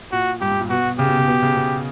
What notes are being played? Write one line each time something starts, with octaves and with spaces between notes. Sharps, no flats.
A#2 F#4
G2 G4
G2
A#2
B2 F#4
C#3 G4
B2
C#3
B2
C#3
B2